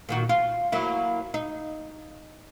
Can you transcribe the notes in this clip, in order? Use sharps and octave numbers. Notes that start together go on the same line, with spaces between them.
A#2 D#3 F#4
F4
F#3 A#3 E4
D#4